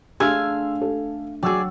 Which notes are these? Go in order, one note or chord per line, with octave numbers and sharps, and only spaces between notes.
A3 D4 G#4 F5 G#5 C6 E6
A4
F#3 F#4 G#4 D5 G5 E6